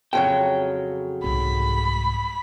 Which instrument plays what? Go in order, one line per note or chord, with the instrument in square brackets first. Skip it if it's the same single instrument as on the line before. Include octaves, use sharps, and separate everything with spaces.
[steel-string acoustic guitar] F2 C#3 F#3 [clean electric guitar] G5
[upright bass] C2 G#2 [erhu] B5